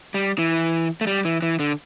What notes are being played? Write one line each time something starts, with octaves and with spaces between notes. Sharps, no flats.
G3
E3
A3
G3
E3
E3
D3